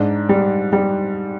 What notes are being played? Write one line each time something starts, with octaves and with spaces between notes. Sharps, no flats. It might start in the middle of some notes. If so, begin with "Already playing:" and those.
Already playing: G#2 D4
G3
G3